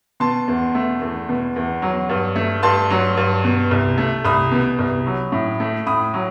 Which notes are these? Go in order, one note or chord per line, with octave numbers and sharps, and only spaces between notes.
B2 A5 C6
E2
A3
E2
B2
E2
F#3
G2
A3
G2 A5 C6
F#3
G2
B2
C2
A3
C2 B5 D#6
B2
C2
F#3
A2
A3
A2 B5 D#6
F#3